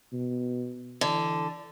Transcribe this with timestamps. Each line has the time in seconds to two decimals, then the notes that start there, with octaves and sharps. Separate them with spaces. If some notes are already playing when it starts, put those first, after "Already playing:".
0.12 B2
1.01 D3 E3